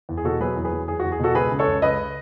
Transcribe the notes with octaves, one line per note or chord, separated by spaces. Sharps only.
E2
G#4
B2 F#4 A4
F#3 G#4 B4
E2
G#4 B4
F#3
E2 G#4
F#4
E2
G#4
B2 F#4 A4
C#2 G#4 B4
C#3
A4 C#5
C#2
C#2 B4 D#5